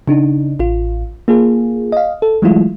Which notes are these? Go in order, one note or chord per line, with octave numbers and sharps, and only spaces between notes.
C#3 D4 D#4
A1 F4
A#3 F4 G#4
D#5 F5
A4
E3 F#3 G#3 A3 E4 F4